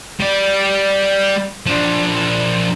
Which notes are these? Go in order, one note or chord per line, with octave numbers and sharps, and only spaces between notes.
G3 D5
F3 D4